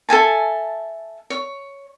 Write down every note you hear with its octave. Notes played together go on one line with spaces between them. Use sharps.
A4 E5 G#5 A5
C#5